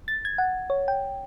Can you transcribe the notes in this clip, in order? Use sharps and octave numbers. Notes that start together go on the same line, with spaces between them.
A6
G#6
F#5
C#5
G5